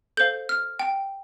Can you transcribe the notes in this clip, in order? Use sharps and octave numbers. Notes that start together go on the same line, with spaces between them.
A4 C5 F5 G6
F6
G5